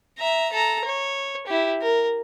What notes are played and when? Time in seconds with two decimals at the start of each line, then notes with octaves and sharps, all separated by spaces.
0.19 E5 A#5
0.53 A4 A#5
0.85 C#5
1.47 E4 G4
1.82 A#4